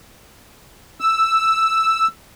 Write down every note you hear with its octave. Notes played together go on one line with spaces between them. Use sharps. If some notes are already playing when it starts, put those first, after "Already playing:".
E6